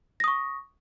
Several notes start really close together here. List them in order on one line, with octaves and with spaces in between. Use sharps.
A#6 D#6 C#6